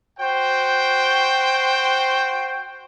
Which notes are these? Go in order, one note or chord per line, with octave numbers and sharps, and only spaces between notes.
F#4 C5 G5